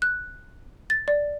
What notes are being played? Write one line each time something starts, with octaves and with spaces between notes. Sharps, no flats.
F#6
A6
D5